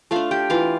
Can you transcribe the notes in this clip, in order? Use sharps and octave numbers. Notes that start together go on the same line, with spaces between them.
A3 D4 F4 F5
G4 G5
E3 F4 F5